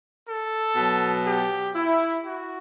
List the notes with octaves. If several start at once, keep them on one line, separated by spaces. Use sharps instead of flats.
A4
B2 F#3
G4
E4
F#4